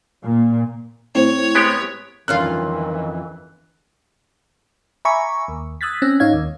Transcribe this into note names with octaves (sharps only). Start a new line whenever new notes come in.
A#2
A2 C4 C#5
G#3 B3 G4
G1 F2 D#3 E3 C#4 F4 A#4 F#6
E5 G#5 A#5 B5 C#6 D6
D#2
D#6 E6 F#6 G#6 A6 B6
C4 C#4 E6 F#6 A#6
G#2 D#4 C#5 F5 G#6
D#2